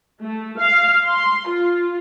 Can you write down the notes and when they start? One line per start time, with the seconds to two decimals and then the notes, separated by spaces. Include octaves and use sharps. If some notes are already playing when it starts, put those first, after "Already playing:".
0.21 A3
0.59 F5
1.05 C6
1.48 F4